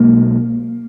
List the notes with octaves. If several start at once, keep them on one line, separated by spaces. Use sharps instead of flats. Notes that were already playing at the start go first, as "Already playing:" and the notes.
Already playing: B1 B2 G#3 A#3